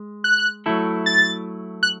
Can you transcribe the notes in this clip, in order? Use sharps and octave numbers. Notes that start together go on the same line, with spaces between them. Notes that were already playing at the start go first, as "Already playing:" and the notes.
Already playing: G#3
F#6
F#3 A3 E4 A4
A6
F#6